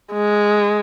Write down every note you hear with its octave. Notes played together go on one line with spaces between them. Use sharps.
G#3